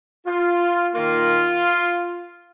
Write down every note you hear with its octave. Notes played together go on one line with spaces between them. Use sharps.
F4
D#3 A#3 F4